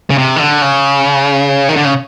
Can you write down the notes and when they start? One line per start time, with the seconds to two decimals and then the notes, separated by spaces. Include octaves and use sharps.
0.10 C#3
0.18 C3
0.36 D#3
0.39 D3
0.62 C#3
1.69 D#3
1.76 D3
1.85 C#3